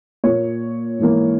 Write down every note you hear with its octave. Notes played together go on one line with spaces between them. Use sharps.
A#2 A#3 C#5
G#2 E3 A#3